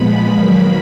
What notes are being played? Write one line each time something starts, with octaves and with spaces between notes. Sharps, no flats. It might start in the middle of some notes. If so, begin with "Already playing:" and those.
Already playing: A#2 F3 G#3 B3 B5
D#3 F#3 A#3